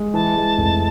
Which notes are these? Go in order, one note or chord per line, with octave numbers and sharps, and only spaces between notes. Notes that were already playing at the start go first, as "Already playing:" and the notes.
Already playing: G#3
E3 A5
G#3
F1